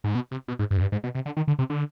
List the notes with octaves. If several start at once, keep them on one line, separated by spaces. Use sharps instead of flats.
G#2
B2
C3
B2
G#2
G2
F2
G2
G#2
B2
C3
D3
D#3
D3
C3
D3